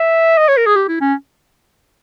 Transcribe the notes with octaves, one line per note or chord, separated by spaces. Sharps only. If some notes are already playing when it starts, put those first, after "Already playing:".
Already playing: E5
D#5
C#5
A#4
G#4
G4
E4
C#4